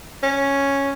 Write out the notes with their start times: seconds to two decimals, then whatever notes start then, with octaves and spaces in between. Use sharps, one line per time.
0.23 C#4